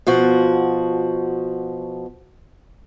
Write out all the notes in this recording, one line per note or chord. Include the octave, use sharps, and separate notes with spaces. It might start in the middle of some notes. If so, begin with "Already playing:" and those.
B2 F3 F#4